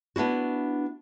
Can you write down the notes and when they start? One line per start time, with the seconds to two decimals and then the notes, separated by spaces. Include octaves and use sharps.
0.16 B3 D4 E4 F#4